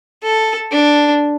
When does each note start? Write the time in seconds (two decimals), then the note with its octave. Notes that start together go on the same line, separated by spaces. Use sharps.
0.23 A4
0.71 D4